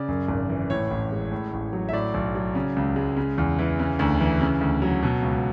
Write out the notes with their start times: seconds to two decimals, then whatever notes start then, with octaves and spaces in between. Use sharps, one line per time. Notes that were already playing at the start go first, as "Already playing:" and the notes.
Already playing: C#3 D5
0.08 F#2
0.28 G#1
0.49 E3
0.70 A2 C#5
0.91 A1
1.12 G#3
1.32 A2
1.53 A1
1.73 F#3
1.89 E5
1.93 A2 D5
2.14 B1
2.35 F#3
2.55 C#3
2.76 C#2
2.96 G#3
3.17 C#3
3.38 E2
3.59 E3
3.79 C#3
3.99 D2
4.20 E3
4.41 C#3
4.61 D2
4.82 F#3
5.03 B2
5.22 C#2